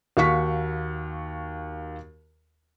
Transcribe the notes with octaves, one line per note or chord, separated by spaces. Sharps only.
D#2 F#4 F5 C#6 B6